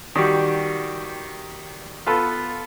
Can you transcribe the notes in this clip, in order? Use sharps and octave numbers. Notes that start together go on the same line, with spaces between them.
D#3 G3 F#4 G4
B3 F4 A4 B4